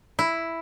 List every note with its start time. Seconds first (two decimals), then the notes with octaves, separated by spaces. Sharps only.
0.19 E4